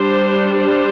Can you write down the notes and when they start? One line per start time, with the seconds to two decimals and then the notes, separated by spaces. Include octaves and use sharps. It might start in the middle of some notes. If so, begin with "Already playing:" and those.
Already playing: G3 D4 C5
0.56 C5